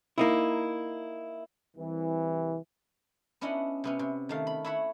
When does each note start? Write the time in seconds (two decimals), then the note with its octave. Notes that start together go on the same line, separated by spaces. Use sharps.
0.18 A#3 D#4 E4
1.77 C2 E3
3.41 B3 C#4 D4 E4 D#5 F#5
3.84 C3 B3 C#4
3.99 C3
4.29 D#3 A3 F5
4.47 B5
4.64 E4 C#5 E5 F#5 B5